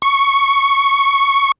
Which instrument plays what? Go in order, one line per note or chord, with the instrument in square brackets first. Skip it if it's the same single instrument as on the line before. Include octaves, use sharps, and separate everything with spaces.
[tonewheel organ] C#6